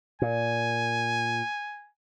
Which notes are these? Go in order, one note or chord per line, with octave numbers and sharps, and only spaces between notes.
A#2 G#5